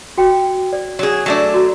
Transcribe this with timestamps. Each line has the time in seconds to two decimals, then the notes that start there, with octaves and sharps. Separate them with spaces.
0.18 F#4 G5
0.73 D5
0.99 F#3 G#4
1.26 F#3 A3 D4
1.54 F#4 A#5